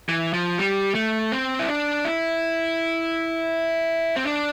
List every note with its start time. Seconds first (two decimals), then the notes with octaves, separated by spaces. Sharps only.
0.09 E3
0.33 F3
0.58 G3
0.95 A3
1.32 C4
1.59 E4
1.68 D4
2.05 E4
4.16 C4
4.26 D4